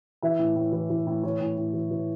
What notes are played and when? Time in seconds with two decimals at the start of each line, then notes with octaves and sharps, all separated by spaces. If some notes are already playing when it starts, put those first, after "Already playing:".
0.22 E3 E5
0.39 A2
0.56 A2
0.72 E3
0.90 E3
1.07 A2
1.23 E3 C#5
1.41 A2
1.57 A2
1.74 E3
1.91 E3